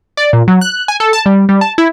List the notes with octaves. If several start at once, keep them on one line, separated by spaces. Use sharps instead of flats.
D5
A#2
F#3
F#6
G#5
A4
A5
G3
G3
A5
E4